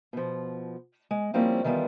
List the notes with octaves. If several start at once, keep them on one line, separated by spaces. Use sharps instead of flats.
B2 F3
G#3
F3 G3 A#3 C4 C#4 E4
D#3 E3 G3 B3 F4